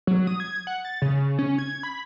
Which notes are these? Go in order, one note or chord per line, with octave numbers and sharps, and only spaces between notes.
F#3
D#6
G#6
F#5
A6
C#3
C#4
G#6
B5